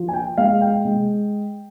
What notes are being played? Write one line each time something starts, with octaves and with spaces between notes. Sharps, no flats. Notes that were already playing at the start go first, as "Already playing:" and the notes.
Already playing: F3
G#5
G5
G#3 F5
G5
G#3